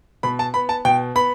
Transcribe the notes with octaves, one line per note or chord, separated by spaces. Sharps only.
B2 B5
A5
B3 B5
A5
B2 G5
B3 B5